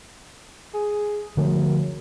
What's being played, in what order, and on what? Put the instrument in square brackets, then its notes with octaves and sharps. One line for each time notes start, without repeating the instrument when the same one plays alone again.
[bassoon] G#4
[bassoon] F#2 [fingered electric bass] D3 F3 A3